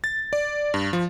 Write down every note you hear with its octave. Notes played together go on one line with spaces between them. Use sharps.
A6
D5
G2
F3